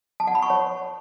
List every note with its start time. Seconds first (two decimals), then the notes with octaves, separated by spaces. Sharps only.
0.20 A5
0.27 F#5
0.35 B5
0.42 C#6
0.50 C#5